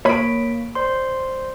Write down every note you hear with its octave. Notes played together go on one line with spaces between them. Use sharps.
A#3 C#5 B5 B6 D7
C5 D5 C6